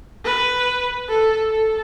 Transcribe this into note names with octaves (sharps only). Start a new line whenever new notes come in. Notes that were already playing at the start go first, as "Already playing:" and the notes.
B4
A4
A4